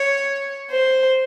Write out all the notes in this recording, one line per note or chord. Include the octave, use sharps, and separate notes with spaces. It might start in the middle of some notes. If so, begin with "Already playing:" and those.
Already playing: C#5
C5